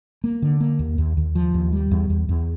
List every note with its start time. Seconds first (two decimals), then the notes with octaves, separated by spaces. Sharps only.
0.24 A#3
0.42 D3
0.61 A#3
0.79 D#2
0.98 D#2
1.17 D#2
1.35 F3
1.54 D#2
1.73 G3
1.91 E2
2.10 E2
2.29 E2